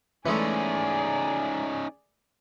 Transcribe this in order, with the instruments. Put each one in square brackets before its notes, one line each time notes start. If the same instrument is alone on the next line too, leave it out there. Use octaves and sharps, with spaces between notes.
[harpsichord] E3 G#3 A3 [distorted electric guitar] C#4 D#4 [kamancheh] G#4 D5